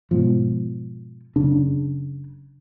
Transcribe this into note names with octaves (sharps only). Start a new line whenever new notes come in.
G#2 B2 F3
F#1 C#3 D4